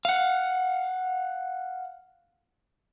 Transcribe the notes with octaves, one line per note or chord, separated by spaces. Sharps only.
F5 F#5